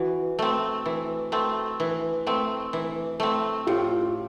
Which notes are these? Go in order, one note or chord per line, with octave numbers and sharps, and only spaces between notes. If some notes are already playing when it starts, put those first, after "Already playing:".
Already playing: E3 E4 F#4
A3 C4
E3
A3 C4
E3
A3 C4
E3
A3 C4
A2 F4 G4